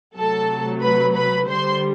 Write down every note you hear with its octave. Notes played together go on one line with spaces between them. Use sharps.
C3 F#3 A3 A4 A5
B4 B5
B4 B5
D3 G3 C5 C6